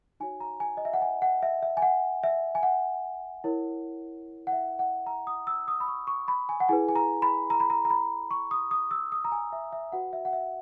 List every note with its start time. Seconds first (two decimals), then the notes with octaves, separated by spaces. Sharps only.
0.20 D#4 F#4 C#5 G#5
0.40 A#5
0.60 G#5
0.77 D#5
0.85 E5
0.93 F#5
1.02 G#5
1.22 F#5
1.42 E5
1.62 E5
1.77 G#5
1.82 F#5
2.24 E5
2.55 G#5
2.63 F#5
3.44 E4 A#4 C#5
4.47 F#5
4.52 E5
4.79 F#5
5.06 A#5
5.27 D#6
5.47 E6
5.68 D#6
5.80 B5
5.88 C#6
6.07 C#6
6.28 B5
6.49 G#5
6.60 F#5
6.69 E4 G#4 B4 G#5
6.89 G#5
6.95 A#5
7.22 B5
7.50 A#5
7.60 B5
7.70 A#5
7.85 A#5
7.90 B5
8.31 C#6
8.51 D#6
8.71 D#6
8.91 E6
9.12 D#6
9.25 A#5
9.32 G#5
9.52 E5
9.73 E5
9.92 F#4 B4 F#5
10.13 E5
10.25 F#5
10.33 E5